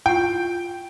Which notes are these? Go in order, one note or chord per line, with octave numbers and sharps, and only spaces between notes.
E4 F4 G5